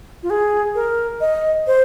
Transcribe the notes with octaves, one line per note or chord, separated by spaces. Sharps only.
F4
G#4
A#4
D#5
C5